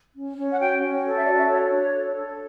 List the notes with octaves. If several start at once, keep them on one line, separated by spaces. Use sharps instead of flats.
C#4
C#4
F#5
F#4 G5
C#4
A4
E5
F#4 D5
E5
C#5
D4
A4
A4